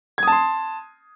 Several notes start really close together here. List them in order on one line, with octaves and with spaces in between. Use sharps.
G#6 D#6 A5 C6